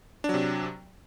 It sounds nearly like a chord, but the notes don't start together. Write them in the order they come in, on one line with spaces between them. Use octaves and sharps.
D4 F#3 C3